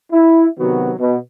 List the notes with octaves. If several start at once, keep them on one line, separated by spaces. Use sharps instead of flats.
E4
C3 D#3 F#3 B3 F#4
B2